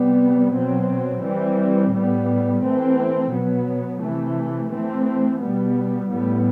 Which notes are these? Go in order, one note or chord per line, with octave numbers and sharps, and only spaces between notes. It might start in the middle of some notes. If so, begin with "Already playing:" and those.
Already playing: C3 G3 B3
B2 F#3 C4
E3 G3 C4
A2 G3 B3
E3 A3 C4
B2 F#3 B3
C3 E3 A3
E3 A3 C4
B2 G3 B3
A2 G3 B3